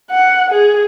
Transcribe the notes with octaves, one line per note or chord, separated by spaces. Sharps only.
F#5
G#4